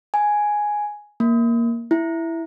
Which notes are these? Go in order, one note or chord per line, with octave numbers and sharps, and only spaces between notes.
G#5
A#3
E4